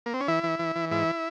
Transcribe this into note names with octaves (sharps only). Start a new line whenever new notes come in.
A#3
C4
C#4
E3 E4
E3
E3
E3
G#2 E4